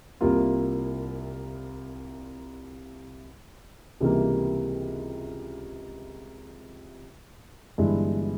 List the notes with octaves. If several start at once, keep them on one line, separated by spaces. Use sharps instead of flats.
C2 C3 G3 A#3 F4
C#2 C3 E3 G3 A#3
G1 G2 E3 G#3 E4